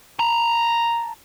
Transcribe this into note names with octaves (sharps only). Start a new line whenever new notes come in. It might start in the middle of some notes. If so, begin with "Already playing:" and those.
A5 A#5